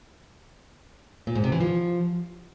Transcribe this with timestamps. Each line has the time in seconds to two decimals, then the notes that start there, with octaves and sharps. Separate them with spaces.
1.27 A#2
1.35 G#2
1.44 C3
1.52 E3
1.61 F3